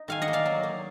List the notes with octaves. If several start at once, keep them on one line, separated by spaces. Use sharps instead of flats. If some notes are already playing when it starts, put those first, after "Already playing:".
Already playing: D#4
D#3 F5 G#5
D#5 F#5
A#3
D5 F5
F#3
A#3